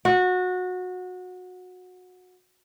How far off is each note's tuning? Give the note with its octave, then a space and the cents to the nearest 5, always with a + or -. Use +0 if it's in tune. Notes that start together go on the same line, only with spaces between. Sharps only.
F#4 -20